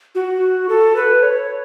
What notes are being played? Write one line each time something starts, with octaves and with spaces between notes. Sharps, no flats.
F#4
A4
B4
C#5